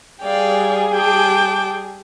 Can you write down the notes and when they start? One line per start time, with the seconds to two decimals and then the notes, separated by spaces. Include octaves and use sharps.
0.21 G3 G#4 D5 F5 G5
0.94 G5 A5 D6